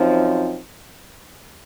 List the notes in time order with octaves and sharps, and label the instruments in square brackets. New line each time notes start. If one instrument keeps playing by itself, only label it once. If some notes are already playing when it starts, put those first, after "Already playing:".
Already playing: [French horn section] F#2 F3 C4 D#4